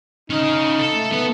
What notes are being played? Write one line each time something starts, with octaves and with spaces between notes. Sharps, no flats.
C#4 D#4 F5
A4
A3
B3